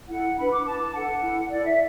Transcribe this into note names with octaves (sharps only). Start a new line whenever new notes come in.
E4 A4 F#5
D4 B4 B5
D6
E4 B4 A5
D4 A4 F#5
E4 A4
E4 A4 D5
E5